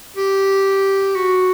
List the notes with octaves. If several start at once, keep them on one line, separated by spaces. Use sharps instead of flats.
G4
F#4